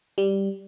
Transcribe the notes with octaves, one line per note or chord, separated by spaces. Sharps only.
G3